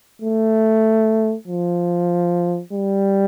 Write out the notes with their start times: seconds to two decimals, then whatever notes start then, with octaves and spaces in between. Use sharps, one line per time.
0.21 A3
1.47 F3
2.73 G3